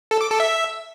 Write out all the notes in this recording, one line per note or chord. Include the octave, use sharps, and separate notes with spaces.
A4
D6
A4
E5